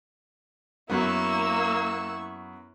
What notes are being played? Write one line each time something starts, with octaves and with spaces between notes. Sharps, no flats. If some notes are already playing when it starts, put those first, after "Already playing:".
F#2 A#3 B3 E4 C#6 E6